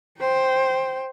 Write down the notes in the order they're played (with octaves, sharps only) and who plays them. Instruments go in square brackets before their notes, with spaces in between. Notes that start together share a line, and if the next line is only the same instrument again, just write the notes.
[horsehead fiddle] C5 G5